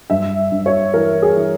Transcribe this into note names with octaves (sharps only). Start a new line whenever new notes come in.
G2 E5
G2
C#5
E3 A#4
G#4
E3